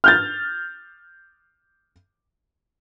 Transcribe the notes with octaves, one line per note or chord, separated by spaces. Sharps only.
F6 G6 A6